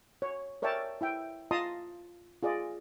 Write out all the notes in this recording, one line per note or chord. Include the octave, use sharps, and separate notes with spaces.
C#5
A#4 C#5 D5 E5 G5 A5
E4 E5 G5
F4 D#5 A5 A#5 C6 D#6
F4 G#4 D5 D#5